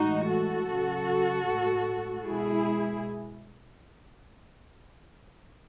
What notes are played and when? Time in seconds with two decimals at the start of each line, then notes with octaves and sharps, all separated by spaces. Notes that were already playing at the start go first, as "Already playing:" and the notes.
Already playing: A2 E3 G#3 D#4 F#4
0.29 F#4 A4
0.69 C#3 F#3
1.47 A2 G#3
2.26 B2 G#3 E4 G#4